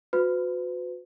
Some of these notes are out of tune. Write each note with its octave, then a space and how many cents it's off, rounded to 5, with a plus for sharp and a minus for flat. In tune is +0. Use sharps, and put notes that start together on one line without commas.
F#4 -30 B4 +35